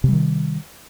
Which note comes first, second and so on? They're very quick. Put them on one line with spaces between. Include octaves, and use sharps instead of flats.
C3 G3 D#3